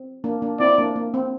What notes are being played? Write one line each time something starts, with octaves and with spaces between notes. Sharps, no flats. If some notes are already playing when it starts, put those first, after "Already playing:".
Already playing: C4
A#3 D4
A#3 D4
C4 E4 D5
A#3 D4
A#3
C4